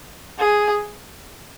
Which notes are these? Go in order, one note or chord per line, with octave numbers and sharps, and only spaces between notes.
G#4